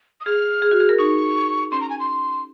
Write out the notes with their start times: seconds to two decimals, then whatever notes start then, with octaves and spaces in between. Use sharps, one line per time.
0.21 D#6
0.25 G#4 F6
0.62 G#4
0.71 F#4
0.80 G#4
0.89 A#4
0.98 D#4 C#6
1.71 C#4 C6
1.81 A#5
1.90 G#5
2.00 C6